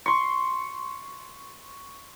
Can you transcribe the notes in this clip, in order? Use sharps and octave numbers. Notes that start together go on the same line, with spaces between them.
C6 C#6